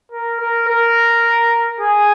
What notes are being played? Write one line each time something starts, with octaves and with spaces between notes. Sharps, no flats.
A#4
A#4
A#4
G#4